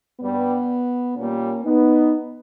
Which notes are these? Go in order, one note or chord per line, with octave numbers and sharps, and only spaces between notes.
G2 G3 B3
A#2 G3 A#3 C#4
B3 D#4